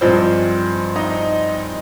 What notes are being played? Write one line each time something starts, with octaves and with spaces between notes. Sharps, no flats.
G2 F3 G#3 C4 C5
D#4 D#5